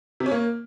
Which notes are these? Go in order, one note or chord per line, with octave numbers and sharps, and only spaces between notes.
C3
C#4
A#3